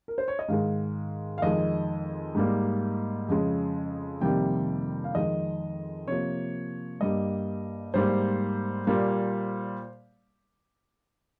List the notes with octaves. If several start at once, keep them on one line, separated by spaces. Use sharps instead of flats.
A#4
C5
C#5
D#5
G#2 D#3 G#3 F5
F5
F2 D#3 G#3 D#5
G#2 G3 A#3
F2 C#3 G#3
F2 C3 D#3 G3 A#3 G5
F5
F2 D#3 G#3 D#5
C3 F3 A#3 C#5
G2 G3 A#3 D#5
G#2 G3 A#3 C5
A#2 G3 A#3